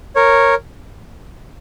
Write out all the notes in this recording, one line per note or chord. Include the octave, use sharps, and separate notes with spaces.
A#4 C#5